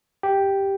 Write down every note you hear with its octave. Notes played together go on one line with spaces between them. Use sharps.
G4 G5